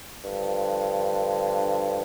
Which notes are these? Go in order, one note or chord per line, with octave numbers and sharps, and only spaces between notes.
G2 D3 F3